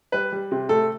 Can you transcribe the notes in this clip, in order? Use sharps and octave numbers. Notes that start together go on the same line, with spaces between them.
G3 B4
G3
C3
A3 A4